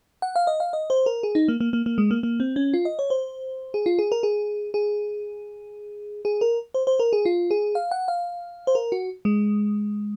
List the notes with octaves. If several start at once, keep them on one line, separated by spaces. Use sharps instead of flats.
F#5
F5
D#5
F5
D#5
C5
A#4
G#4
D#4
A#3
A#3
A#3
A#3
G#3
A#3
A#3
C4
C#4
F4
D#5
C#5
C5
G#4
F4
G#4
A#4
G#4
G#4
G#4
A#4
C5
C5
A#4
G#4
F4
G#4
F5
F#5
F5
C5
A#4
F#4
G#3